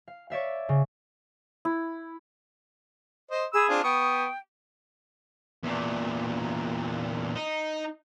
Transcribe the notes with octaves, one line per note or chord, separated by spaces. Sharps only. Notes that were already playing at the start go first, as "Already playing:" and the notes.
F5
C#5 D5 E5 F5
C#3
E4
C5 D#5
G#4 B5 E6
C4 D4 F4
B3 G5 C#6 D#6
E2 A#2
D#4